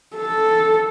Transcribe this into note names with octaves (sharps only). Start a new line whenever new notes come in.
A4